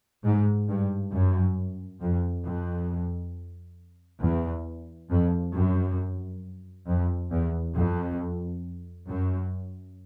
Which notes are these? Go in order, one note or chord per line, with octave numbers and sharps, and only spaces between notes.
G#2
G2
F#2
F2
F2
E2
F2
F#2
F2
E2
F2
F#2